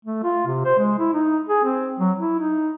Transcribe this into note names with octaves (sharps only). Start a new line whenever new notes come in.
A3
F4
C3
C5
G#3
E4
D#4
G#4
C4
F#3
E4
D#4